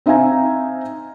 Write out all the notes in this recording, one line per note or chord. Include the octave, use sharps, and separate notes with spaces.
C4 D#4 E5 F5 G#5 A#5